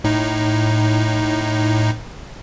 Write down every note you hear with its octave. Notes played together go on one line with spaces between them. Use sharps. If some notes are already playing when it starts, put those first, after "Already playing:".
A2 D#4